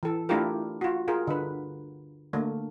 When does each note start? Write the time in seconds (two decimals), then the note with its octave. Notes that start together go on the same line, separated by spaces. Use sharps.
0.03 E3 A4
0.29 A3 D4 E4 F4 G4 A#4
0.81 F4 F#4
1.08 F4 G#4 A#4
1.27 D3 B4
2.33 D3 A3 A#3